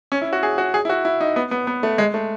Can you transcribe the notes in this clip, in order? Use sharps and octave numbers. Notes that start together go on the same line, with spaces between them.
C#4
E4
F#4
G#4
F#4
G#4
E4
F#4
E4
D#4
B3
B3
B3
A3
G#3
A3